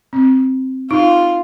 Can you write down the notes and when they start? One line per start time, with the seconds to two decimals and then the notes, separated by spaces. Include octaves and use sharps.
0.13 C4
0.91 D#4 F4